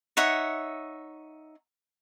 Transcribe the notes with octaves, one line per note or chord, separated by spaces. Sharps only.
D#4 C#5 E5 F#5